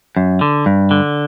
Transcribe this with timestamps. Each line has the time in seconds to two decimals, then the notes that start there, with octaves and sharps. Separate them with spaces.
0.17 F#2
0.41 D3
0.66 G2
0.91 D3